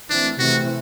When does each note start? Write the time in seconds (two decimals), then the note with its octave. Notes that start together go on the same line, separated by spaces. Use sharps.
0.10 E3 A3 C4 D4
0.38 C3 E3 A3 C4 F#4